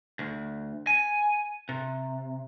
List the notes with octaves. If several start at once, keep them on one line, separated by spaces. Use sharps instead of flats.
D2
G#5
C3